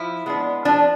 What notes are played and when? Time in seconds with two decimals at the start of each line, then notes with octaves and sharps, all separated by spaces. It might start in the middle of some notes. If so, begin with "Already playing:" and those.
Already playing: F3 E4
0.26 G#3 B3 D4
0.65 F3 D4